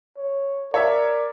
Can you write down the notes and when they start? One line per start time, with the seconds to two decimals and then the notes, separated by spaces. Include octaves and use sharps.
0.17 C#5
0.74 A#4 C#5 D5 E5 G#6